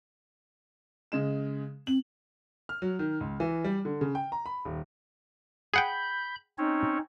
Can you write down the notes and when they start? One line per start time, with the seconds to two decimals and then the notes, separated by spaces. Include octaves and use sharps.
1.12 C#3 G#3 E7
1.87 C4 F#7
2.69 F6
2.82 F#3
2.99 D#3
3.20 C#2
3.40 E3
3.64 G3
3.85 D3
4.01 C#3
4.15 G5
4.32 A#5
4.46 B5
4.65 D#1
5.74 G#4 F#5 G5 B5 G6
6.58 C4 C#4 D#4 C#5